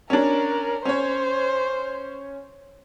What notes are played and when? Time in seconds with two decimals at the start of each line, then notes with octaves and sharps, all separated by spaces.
0.10 C#4 D4 A#4
0.85 C#4 C5 C#5